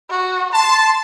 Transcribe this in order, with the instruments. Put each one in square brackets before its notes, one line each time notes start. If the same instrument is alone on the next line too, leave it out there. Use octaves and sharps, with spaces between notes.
[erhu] F#4
[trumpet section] A5 [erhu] C6